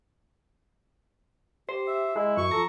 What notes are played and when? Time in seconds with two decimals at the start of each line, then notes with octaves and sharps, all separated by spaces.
1.69 G4 C5
1.88 E5
2.16 G#3 E4 D#5
2.37 F#2 C#6
2.51 F3 A4 A#5